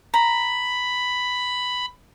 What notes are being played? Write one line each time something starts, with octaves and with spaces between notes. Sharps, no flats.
A#5 B5